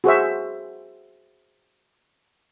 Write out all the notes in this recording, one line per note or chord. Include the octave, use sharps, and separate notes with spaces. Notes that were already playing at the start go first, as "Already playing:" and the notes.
F#4 G#4 C5 E5